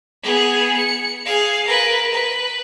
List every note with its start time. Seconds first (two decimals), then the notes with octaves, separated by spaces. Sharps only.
0.23 B3 G#4
0.77 C#7
1.25 G#4 F5
1.65 A#4 B4
2.12 B4